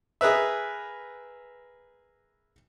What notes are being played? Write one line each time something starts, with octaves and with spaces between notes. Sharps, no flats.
G#4 A#4 B4 E5